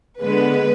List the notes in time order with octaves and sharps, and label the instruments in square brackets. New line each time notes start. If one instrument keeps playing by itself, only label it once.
[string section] D3 G#3 B3 B4